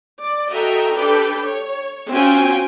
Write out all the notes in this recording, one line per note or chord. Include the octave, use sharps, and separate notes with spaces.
D5
F#4 A4 D#5 E5 G5 A#5
D4 G4 A4 B4 G5
C#5
C4 C#4 F4 F#4 G5 G#5